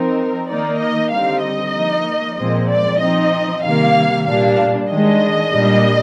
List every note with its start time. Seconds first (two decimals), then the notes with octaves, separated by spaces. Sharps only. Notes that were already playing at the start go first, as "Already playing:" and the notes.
Already playing: F3 C4 D#4 A#4
0.48 D#3 A#3 D#4 D5
0.80 D#5
1.12 D3 G3 C4 D#4 F5
1.43 D#5
1.75 F3 A#3 D#4
2.37 A#2 F3 G#3 C4 D#5
2.69 D5
3.01 F3 C4 D#4 D#5
3.64 C3 D#3 G3 A#3 F5
4.27 A#2 G3 D4 F5
4.90 D#3 G#3 D4 D#5
5.53 A#2 G3 D4